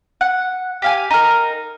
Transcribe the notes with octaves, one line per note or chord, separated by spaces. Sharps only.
F#5
G4 F5 G#5
D#4 A#4